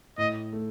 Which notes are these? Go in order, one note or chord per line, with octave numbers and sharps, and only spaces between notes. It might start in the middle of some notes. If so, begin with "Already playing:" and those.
A2 D#5
A3